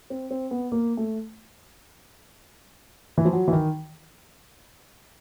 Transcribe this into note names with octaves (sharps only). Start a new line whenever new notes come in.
C4
C4
B3
A#3
A3
E3
F3
F#3
E3
D#3